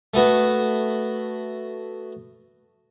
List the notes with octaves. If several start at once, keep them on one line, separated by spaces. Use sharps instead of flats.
A3 B3 F#4